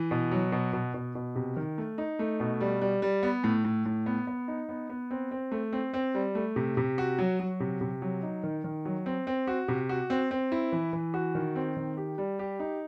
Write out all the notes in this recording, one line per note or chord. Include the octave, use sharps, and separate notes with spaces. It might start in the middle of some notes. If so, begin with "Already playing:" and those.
Already playing: E3
B2
F#3
B2
B2
B2
B2
C3
D#3
A3
D#4
A3
B2
G3
G3
G3
B3
A2
A2
A2
B3
B3
D#4
B3
B3
C4
C4
A3
C4
C4
G3
A3
C3
C3
F#4
F#3
F#3
C3
C3
F#3
D#4
D#3
D#3
F#3
C4
C4
F#4
C3
F#4
C4
C4
E4
E3
E3
F#4
D#3
C4
D#3
G4
G3
G4
D#4